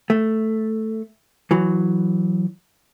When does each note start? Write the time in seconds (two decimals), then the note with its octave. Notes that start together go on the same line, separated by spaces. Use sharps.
0.10 A3
1.51 E3 F#3